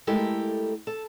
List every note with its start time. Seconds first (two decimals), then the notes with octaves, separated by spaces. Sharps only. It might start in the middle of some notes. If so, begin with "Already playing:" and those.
0.07 G#3 A3 E4 G4 A4 A#4
0.87 A4